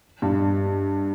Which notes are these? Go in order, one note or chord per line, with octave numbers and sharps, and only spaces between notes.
G2